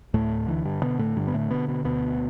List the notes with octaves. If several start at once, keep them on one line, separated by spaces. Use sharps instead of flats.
D2 A2 A3
D3 E3
G2 G3
B2 D3 B3
A2 A3
G2 D3 G3
B3
A2 A3
B2 D3 B3
B2 B3
D2 B2 B3